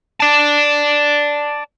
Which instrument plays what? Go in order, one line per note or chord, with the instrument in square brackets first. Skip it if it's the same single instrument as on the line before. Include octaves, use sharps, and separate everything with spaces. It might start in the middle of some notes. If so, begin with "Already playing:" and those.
[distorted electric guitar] D5 A5